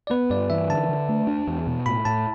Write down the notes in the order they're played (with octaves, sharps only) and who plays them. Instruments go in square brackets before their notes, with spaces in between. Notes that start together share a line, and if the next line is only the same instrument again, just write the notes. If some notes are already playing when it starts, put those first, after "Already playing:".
[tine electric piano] D5
[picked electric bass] B3 [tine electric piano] B4
[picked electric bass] G2 [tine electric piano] D5
[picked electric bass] E3 [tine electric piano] E5
[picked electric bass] D3 [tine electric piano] A5
[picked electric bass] D3
A3
D4
E2
B2
[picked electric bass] A2 [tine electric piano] B5
[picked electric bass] A2 [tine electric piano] A5